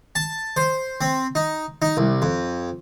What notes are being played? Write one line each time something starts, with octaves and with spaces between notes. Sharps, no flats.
A5
C5
C4
D#4
D#4
C2
F2